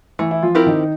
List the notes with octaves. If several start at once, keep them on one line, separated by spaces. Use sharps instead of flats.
E3 A3 E4
E4
F3 F4
C4 E4 G4 A#4
D#3 D#4